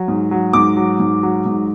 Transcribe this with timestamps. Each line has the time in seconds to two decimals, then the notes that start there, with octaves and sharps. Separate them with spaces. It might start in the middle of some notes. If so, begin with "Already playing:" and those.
Already playing: F#3
0.08 G#2
0.31 F#3
0.53 G#2 D6
0.77 F#3
1.00 G#2
1.23 F#3
1.46 G#2